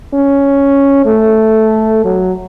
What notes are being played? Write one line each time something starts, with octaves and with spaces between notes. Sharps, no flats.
C#4
A3
F#3